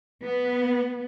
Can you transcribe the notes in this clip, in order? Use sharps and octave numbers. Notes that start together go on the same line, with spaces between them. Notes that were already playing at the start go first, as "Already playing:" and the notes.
B3